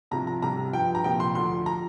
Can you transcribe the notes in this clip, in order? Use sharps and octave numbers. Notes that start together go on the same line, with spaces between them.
C2 C3 F3 A#5
A#5
C2 C3 G3 A#5
G2 F3 G5
A#5
C2 A#2 F3 G5
C6
D2 D3 F3 C6
F3 A#5